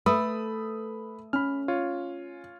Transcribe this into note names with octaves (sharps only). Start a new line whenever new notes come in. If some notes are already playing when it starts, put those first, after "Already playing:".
A3 B4 B5 D#6 E6
C#4 B5 F6
F4 C#5